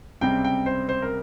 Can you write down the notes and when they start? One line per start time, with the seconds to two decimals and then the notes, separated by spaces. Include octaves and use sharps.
0.21 C#2 C3 G3 C4 G5
0.44 G5
0.66 C5
0.89 C5
1.02 A#4